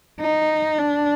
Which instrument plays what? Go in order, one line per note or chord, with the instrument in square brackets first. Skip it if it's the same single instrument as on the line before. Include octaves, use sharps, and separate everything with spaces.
[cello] D#4
D4